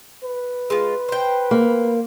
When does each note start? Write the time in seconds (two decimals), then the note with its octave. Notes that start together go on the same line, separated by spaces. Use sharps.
0.23 B4
0.70 G#3 F4
1.09 C5 G5
1.51 A#3